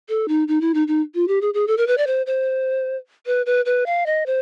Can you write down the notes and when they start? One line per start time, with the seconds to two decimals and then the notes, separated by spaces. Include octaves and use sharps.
0.09 A4
0.28 D#4
0.48 D#4
0.61 E4
0.74 D#4
0.88 D#4
1.15 F4
1.28 G4
1.41 G#4
1.54 G#4
1.67 A4
1.77 A#4
1.87 B4
1.98 D5
2.07 C5
2.26 C5
3.26 B4
3.46 B4
3.65 B4
3.86 F5
4.06 D#5
4.26 C5